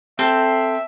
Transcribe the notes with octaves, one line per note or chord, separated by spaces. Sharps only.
C4 A4 E5